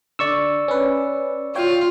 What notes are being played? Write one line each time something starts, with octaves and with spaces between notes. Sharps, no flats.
D3 D5 C#6 E6
C#4 B4
F4 C#5 G5